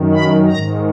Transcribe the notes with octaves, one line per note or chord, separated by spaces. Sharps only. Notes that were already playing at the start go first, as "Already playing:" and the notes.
Already playing: F#2 D#3
B5
G#2 D#3 A#5